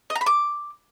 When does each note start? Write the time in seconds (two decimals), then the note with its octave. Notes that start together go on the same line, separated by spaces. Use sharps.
0.10 D#5
0.15 A#5
0.21 B5
0.26 D6